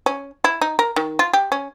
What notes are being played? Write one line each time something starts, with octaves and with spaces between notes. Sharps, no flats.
C#4
E4
D#4
A#4
D#3
F4
G4
C#4